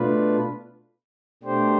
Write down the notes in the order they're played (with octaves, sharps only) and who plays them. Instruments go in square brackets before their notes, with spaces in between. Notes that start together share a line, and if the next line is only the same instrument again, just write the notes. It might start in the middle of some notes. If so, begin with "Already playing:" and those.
Already playing: [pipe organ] B2 A3 D4 F4 B4
B2 A3 D4 G4 C5